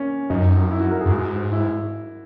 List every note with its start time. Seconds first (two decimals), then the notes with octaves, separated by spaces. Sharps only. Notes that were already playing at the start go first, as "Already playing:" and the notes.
Already playing: A#3 C#4
0.30 F#2 D#4
0.71 E4
0.81 F#4
0.91 A#4
1.01 G#4
1.05 F#2
1.11 G#2 F#4
1.52 E4